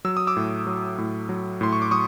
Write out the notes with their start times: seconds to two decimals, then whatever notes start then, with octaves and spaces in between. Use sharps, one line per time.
0.05 F#3 E6
0.17 D#6
0.27 D6 E6
0.36 A2
0.67 F#3
0.98 A2
1.29 F#3
1.61 A2 C6
1.73 C#6
1.82 D6
1.91 F#3 C#6 D#6